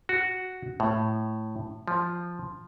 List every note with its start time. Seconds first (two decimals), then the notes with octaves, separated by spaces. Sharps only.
0.09 F#4
0.80 A2
1.88 F3